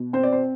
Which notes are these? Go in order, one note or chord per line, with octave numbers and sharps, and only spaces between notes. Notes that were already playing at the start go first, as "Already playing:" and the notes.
Already playing: B2
C4 C5
D5
C5